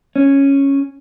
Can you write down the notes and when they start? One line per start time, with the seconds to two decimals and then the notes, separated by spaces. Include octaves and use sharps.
0.16 C#4